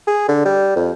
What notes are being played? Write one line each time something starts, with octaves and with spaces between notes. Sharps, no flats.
G#4
D3
G3
F2